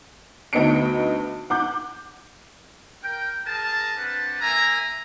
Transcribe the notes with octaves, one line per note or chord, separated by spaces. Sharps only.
D2 B3 D#4 C#7 D7
F#5 D6 G6
A#4 G5
G#4 A#4 A5
C4 D4 B4 F#5 A5
A#3 E5 G#5 A#5